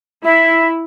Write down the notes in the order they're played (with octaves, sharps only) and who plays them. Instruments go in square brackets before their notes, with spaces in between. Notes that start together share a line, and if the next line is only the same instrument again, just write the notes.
[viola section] E4 [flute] E5